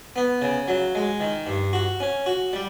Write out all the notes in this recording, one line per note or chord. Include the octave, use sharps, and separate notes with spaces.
B3
C#3
F#3
G#3
D#3
G2
F#4
C#4
F#4
G3